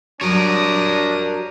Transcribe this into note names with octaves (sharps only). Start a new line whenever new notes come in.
F#3 G3 D4 A#4 C#5 D#6